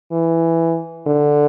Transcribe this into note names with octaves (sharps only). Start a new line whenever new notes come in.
E3
D3